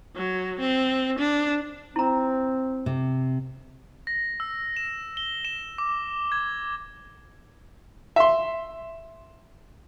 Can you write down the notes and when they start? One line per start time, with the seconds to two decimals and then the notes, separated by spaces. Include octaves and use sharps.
0.16 F#3
0.60 C4
1.19 D4
1.96 C4 E4 A#5
2.86 C3
4.07 A#6
4.40 E6
4.77 E7
5.17 G7
5.45 E7
5.78 D6
6.32 G#6
8.16 E5 C6